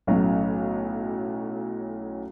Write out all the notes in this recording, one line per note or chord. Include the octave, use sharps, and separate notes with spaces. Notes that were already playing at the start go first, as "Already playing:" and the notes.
B1 A2 F#3 C#4